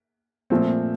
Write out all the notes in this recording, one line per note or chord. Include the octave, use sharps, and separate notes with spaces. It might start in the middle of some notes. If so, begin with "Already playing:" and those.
A#2 F3 A3 C4